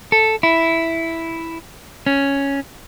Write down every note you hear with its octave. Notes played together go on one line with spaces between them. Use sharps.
A4
E4
C#4